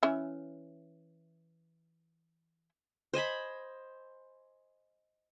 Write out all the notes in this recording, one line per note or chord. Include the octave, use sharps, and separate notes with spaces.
E3 C#4 E5
C5 D#5 G#5 B5